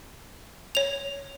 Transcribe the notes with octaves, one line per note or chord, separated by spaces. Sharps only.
C#5 F7